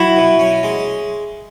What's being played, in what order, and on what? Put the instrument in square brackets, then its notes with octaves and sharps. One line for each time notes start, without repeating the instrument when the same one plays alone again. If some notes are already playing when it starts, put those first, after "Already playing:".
Already playing: [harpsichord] F#3 F#4 [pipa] E4
[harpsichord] B2
C#4
G#3